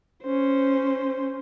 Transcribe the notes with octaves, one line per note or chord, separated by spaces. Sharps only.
C#4 C5